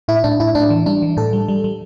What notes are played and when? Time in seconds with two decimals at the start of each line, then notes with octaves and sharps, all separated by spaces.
0.08 A2 E4
0.24 A2 D4
0.40 A2 E4
0.55 A2 D4
0.70 E3
0.86 G3 D4
1.02 E3
1.17 A2 A4
1.33 G3
1.48 G3
1.64 G3